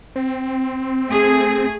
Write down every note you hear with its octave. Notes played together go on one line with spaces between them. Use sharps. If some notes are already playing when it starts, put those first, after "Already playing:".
C4
A3 G#4